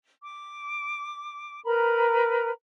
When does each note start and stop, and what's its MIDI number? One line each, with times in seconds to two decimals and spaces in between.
0.22 1.60 86
1.66 2.50 70
1.66 2.50 71
1.66 2.50 82
1.66 2.50 83